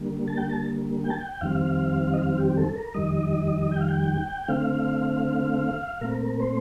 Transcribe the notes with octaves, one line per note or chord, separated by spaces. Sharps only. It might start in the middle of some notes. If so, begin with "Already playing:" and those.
Already playing: D3 G3 A#3
A5
G5
A5
G5
A5
G5
F2 D#3 G3 C4 F5
D#5
F5
G4
A4
A#4
F2 D#3 G3 D#5
G5
F5
G5
D3 A3 C4 F5
A#2 A3 C4 A#4
C5